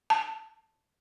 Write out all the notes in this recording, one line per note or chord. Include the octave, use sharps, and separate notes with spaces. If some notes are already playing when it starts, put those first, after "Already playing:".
A5